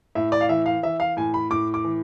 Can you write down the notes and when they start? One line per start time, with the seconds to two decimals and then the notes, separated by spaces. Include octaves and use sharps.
0.15 A2 E5
0.32 D5
0.41 F5
0.49 E3 E5
0.66 F5
0.83 E3 E5
1.00 F5
1.17 A2 G#5
1.34 B5
1.50 A2 D6
1.74 D6
1.84 E3